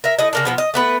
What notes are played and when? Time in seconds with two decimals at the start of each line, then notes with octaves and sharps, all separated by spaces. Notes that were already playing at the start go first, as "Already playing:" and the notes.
0.04 A#4 E5
0.19 A3 E4 D#5
0.33 C#3 A#3 D4
0.45 B2 F3 B3
0.58 D#5
0.74 A3 B3 B4